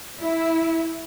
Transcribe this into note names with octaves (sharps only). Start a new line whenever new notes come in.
E4